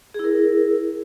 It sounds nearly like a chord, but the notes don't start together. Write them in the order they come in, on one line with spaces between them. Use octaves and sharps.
G#4 E4 A#4